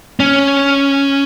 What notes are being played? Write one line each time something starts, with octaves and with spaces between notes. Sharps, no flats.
C#4